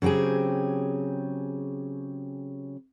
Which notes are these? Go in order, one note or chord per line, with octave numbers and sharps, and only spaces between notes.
C#3 F#3 C4 G4 G#4